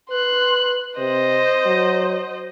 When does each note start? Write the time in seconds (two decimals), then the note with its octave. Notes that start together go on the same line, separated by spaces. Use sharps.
0.10 B4 C6 F#6
0.98 C3 C5 D#5
1.66 F#3